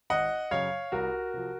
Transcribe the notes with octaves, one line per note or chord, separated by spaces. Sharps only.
G#1 D#5 F#5
F#2 C#3 C#5 F5
C2 F#4 A#4
C3 F3